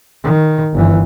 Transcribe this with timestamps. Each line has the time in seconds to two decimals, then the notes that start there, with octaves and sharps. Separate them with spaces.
0.24 D#3
0.75 G1 E3